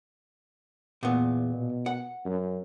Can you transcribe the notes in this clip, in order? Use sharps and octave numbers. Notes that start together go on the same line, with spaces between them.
E2 A#2 B3
B2
F#5
F#2